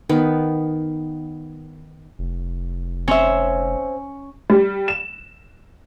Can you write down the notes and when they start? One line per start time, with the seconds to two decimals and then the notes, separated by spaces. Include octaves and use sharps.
0.09 D#3 B3
2.19 F1
3.08 C4 C#4 C5 E5
4.50 G3
4.88 E7